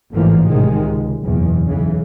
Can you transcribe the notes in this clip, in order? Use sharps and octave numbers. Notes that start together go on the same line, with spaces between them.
A1 G#2 D3 E3 F3 A#3
A1 C3 D#3 G#3
C#2
F#1 E2 B2
B1 C#3 E3